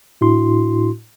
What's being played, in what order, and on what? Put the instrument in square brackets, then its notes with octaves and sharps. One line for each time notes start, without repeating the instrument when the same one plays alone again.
[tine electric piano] A2 D4 E4 F#4 C6